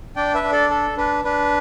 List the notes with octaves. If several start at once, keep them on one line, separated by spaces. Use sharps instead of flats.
D4 D5 G5
B4 E5
D4
A4 D5
A4
D4 B4
D4 B4